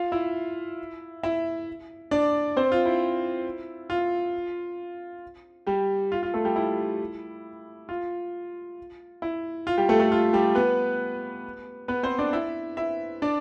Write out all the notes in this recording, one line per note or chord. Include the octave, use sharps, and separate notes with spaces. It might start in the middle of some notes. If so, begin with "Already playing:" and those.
Already playing: F4 F5
E4 E5
E4 E5
D4 D5
C4 C5
F4
E4
F4
G3 G4
F4
F4
A3 A4
G3 G4
E4
F4
E4
F4
G3 G4
A3 A4
A3 A4
F4
G3 G4
B3 B4
B3 B4
C4 C5
D4 D5
E4 E5
E4 E5
D4 D5